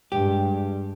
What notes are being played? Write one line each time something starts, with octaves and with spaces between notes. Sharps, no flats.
G2 G#3 G4